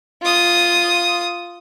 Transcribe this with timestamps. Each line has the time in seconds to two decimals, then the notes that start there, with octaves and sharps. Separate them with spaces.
0.23 F4 D#6